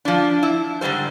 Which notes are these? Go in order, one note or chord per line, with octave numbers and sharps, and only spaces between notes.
F3 D4
E4
G#2 D3 D#3 G3 C5